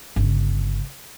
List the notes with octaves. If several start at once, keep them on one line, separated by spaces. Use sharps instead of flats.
G1 C#3